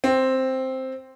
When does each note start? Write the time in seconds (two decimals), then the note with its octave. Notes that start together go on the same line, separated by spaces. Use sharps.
0.04 C4